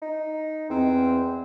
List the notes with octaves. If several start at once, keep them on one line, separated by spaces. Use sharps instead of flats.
D#4
E2 C4